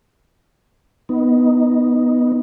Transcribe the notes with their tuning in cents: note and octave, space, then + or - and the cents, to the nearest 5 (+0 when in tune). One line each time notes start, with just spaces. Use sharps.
B3 +0 D#4 +0